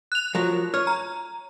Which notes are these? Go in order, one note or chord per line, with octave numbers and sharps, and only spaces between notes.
F#6 F7
F3 F#3 A#4
C#5 F6
A#5